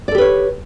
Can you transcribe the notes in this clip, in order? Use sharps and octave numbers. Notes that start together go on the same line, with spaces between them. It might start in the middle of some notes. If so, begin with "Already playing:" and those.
G4 A4 B4 C#5 D5